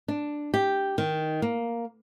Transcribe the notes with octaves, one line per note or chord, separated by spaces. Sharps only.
D4
G4
D#3
A#3